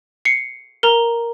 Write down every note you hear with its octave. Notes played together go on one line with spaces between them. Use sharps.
C7 C#7
A#4 A#5